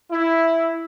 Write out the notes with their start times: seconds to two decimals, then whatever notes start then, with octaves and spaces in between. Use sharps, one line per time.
0.11 E4